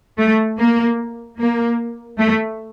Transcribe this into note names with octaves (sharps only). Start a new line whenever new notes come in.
A3
A#3
A#3
A3